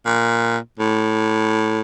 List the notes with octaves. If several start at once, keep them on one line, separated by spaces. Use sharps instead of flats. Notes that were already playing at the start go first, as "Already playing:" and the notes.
A#2
A2